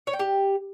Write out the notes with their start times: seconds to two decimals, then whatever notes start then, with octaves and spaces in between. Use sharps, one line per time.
0.07 C#5
0.13 G5
0.19 G4